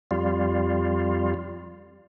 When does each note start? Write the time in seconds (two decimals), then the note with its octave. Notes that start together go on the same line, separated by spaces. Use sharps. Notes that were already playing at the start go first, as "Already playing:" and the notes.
0.11 F2 G3 F4